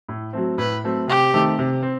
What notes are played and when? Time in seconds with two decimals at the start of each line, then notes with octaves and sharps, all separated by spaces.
0.09 A2
0.33 F#3 A3 C4
0.58 A2 B4
0.84 F#3 A3 C4
1.08 C3 G4
1.33 D#3 A3 C4
1.59 C3
1.83 C4